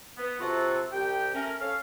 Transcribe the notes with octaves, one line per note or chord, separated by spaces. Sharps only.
B3
C3 F4 F#4 A4
C2 G4 G5
A3 C#4 A#4
C#4 A4 F5